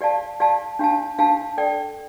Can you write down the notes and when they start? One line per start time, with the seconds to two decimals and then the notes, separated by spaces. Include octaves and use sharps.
0.01 G4 D5 F5 A5
0.40 G4 D5 F5 A5
0.79 D4 G4 F5 A5
1.18 D4 G4 F5 A5
1.57 A4 D5 G5